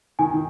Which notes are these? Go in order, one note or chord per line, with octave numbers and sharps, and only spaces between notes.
D#3 G#5
D#3